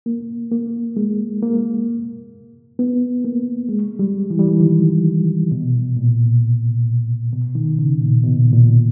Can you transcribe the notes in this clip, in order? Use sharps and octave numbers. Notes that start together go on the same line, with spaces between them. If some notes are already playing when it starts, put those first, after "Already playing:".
A#3
A#3
G#3
A#3
B3
A#3
G#3
G3
E3
G3
E3
D#3
B2
A#2
B2
D#3
C#3
A#2
B2
A#2